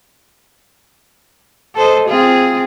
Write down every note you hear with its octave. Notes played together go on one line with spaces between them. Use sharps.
A4 C5 D#5
C4 F4 G#4